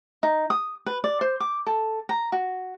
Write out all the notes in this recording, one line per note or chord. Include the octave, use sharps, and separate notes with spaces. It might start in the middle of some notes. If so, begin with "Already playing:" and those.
D#4
D#6
B4
D5
C5
D6
A4
A#5
F#4